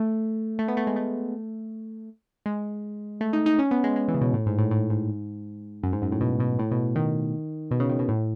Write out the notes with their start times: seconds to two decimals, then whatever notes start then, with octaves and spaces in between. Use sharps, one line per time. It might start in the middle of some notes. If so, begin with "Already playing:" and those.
Already playing: A3
0.59 A3
0.68 B3
0.77 A3
0.87 G#3
0.96 A3
2.46 G#3
3.21 A3
3.33 D#4
3.46 D#4
3.59 C#4
3.71 B3
3.84 G#3
3.96 G#3
4.08 E3
4.14 C#3
4.21 B2
4.33 A2
4.46 G#2
4.58 A2
4.71 A2
4.90 G#2
5.83 F#2
5.93 G#2
6.02 F#2
6.12 A2
6.21 B2
6.40 B2
6.59 A2
6.71 B2
6.96 D#3
7.71 B2
7.80 C#3
7.89 D#3
7.99 B2
8.09 A2